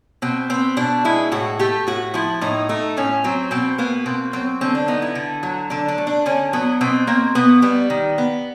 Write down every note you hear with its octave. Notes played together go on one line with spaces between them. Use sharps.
B2 C4
B3 C4
B2 D4
G#3 E4
A2 F#4
A3 G4
A2 F#4
F3 E4
A2 D#4
A3 D#4
A2 C#4
F#3 C4
B2 C4
A#3 B3
B2 C4
F#3 C4
D3 C4
D4
B3 D#4
E4
D3
F#3
D3 D4
D4
A3
D4
D3 C#4
F#3 B3
B2 C4
A#3 C4
B2 B3
G3 B3
D#3
B3